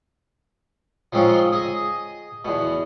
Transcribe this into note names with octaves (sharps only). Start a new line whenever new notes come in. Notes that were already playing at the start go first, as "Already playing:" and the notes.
F3 G#3 C4 C#4 D#4 F4
G#4 D#5
E2 B2